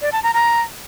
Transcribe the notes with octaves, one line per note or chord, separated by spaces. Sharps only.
D5
A5
A#5
A#5